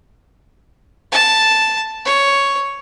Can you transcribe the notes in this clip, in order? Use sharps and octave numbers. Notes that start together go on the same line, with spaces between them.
A5
C#5